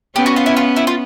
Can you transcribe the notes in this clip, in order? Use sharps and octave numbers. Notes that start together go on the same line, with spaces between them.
B3 C#4 G4
F#4
F4
E4
F4
E4
F4